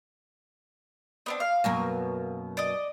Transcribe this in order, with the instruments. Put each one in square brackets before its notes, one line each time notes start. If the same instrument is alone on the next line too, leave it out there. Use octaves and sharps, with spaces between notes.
[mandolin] B3 C4 D4
F5
[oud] F#2 B2 A#3
[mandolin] D5 D#5